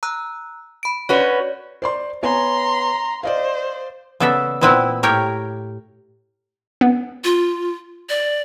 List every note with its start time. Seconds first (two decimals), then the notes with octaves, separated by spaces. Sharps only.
0.03 A#5 E6 F#6
0.83 B5 D7
1.09 C#4 F#4 B4 C#5 D5
1.82 C5 D5 C6
2.23 B3 C#5 G#5 A#5 C6
3.23 C5 D5 D#5 F5
4.20 C#3 B3 A4 D5 E5
4.61 A#2 B3 C4 E4 B4
5.03 A2 G4 A#4 C#5 G5
6.81 B3
7.24 F4
8.09 D5